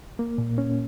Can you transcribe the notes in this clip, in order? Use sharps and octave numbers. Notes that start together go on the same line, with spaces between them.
A#3
A#2
C#4